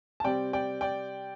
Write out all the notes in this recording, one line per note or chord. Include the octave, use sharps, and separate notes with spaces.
A5
C3 G3 C4 D5 G5
D5 G5
D5 G5